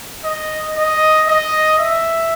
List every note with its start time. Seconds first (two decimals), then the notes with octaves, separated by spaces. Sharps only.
0.25 D#5
0.77 D#5
1.28 D#5
1.79 E5